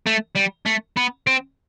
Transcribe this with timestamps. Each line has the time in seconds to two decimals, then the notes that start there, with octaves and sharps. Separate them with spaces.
0.07 A3
0.36 G3
0.66 A3
0.97 B3
1.27 C4